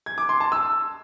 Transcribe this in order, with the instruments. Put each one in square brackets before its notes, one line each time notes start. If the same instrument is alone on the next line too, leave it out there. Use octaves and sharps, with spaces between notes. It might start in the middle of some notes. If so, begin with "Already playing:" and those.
[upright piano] G#6
D6
C6
A5
E6